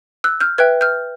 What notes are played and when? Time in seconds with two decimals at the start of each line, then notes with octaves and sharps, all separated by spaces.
0.24 E6 F#6
0.40 F6 G6
0.58 B4 E5 G5 F#6 G#6
0.81 F6 G6